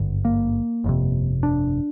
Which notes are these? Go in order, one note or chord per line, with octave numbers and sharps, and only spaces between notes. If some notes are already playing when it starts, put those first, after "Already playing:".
Already playing: G#1 G2 D3
A#3
G1 F2 C3
D4